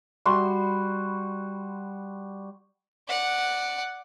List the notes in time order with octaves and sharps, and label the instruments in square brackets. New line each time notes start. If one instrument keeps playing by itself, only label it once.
[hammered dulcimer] G3 F#4 C6
[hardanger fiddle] D5 F#5